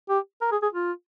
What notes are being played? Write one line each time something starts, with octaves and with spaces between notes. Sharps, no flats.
G4
A#4
G#4
G#4
F4